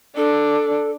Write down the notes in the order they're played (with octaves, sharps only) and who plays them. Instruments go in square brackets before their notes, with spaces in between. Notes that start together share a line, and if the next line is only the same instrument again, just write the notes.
[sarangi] D4 [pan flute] A4